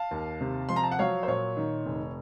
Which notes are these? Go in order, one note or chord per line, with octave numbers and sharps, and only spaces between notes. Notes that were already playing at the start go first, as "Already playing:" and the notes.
Already playing: F5 A5
D#2
C3
F3 C6
A#5
A5
F#5
F#3 C#5 F5
C5
A#2 C#5
D#3
F1